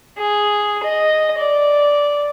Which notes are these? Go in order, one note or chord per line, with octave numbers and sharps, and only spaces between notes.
G#4
D#5
D5